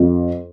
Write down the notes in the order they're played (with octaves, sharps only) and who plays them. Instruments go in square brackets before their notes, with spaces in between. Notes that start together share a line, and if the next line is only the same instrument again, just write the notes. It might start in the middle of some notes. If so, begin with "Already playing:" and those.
Already playing: [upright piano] F2